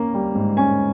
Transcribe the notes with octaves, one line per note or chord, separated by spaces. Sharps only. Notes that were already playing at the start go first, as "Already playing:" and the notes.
Already playing: A#3 C#4
G3
G#2
C#4 G#5